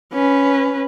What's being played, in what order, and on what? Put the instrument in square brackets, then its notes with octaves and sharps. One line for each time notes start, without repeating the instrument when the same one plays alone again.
[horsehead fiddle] C#4 B4